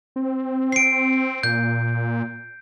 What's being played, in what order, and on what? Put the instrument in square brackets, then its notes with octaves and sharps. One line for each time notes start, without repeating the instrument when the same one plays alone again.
[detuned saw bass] C4
[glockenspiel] C7 D7
[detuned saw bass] A#2 [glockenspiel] G6